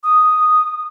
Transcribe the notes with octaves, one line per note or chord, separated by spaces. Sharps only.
D#6